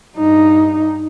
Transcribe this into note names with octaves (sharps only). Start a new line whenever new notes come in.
G2 D#4